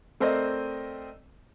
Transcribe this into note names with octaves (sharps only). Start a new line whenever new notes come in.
A3 C4 A#4 C5 D5 D#5